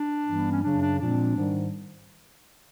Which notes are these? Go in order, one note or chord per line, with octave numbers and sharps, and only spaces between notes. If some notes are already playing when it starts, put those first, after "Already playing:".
Already playing: D4
G2 E3 G3 B3
C#4
F#2 C#3 F#3 D4
D4
A#2 F3 G#3 C4 D4
G#2 D#3 G3